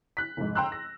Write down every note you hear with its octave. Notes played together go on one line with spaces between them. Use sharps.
F#6 B6
F1 G#2
G5 A#5 C6 E6 F#6
A#6